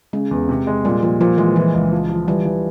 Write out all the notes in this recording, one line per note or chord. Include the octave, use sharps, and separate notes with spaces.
C#3 G#3
E2
C3
G#3
A#2 G3
A#2 F3
A#2 F3
E3 G#3
E3 F3
C#2
F3
F3
E3 G3
E3